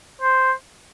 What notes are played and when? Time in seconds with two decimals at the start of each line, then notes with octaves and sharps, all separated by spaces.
0.22 C5